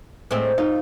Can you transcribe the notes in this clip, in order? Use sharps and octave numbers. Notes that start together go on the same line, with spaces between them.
A2 G#3 C4
D#4 F4